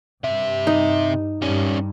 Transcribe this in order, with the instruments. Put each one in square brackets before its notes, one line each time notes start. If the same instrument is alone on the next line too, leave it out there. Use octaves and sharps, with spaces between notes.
[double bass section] G2 G3 [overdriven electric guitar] C3 E5
[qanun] D#4
[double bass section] G2 [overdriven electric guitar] G3 C#4